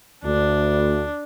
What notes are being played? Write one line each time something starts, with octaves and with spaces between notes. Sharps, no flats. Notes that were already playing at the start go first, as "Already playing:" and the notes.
D2 D4